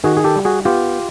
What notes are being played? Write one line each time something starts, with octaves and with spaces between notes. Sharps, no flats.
D#3 F#4 G#4
G#4
G4 A4
G3
F#4 G#4
B3 F4 G4